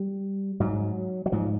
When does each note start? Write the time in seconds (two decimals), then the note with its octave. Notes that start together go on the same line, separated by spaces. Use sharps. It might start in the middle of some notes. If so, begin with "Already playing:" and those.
Already playing: G3
0.60 G#2 F#3
1.26 F#3
1.32 G#2 F3